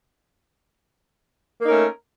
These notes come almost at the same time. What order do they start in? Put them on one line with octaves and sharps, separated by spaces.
A#3 D#4 A#4 C#4 A3